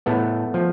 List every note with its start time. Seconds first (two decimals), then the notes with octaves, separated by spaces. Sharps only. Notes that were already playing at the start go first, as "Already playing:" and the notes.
0.06 A2 A3 B3
0.54 F3